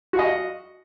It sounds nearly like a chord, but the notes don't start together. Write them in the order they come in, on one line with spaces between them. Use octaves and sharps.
F#4 F5 D#5